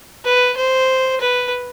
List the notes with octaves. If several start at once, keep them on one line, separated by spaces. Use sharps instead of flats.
B4
C5
B4